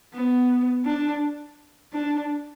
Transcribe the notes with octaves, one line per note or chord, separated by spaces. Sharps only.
B3
D4
D4